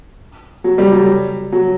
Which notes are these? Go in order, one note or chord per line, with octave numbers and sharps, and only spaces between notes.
F#3
G3
F#3
F#3